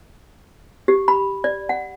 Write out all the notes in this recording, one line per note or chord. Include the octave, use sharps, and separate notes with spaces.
G4
B5
D5
F#5